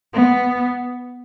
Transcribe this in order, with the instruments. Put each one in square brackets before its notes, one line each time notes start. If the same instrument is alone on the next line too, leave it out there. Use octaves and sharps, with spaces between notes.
[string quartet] B3